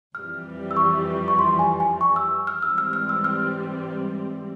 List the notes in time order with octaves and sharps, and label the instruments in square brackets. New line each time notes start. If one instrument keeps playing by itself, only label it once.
[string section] F2 E3 G3 [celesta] F6
[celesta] E6
C#6
C#6
C6
G#5
G#5
C#6
E6
F6
[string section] G#2 E3 G3 C4 [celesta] E6
[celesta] F6
F6
E6
F6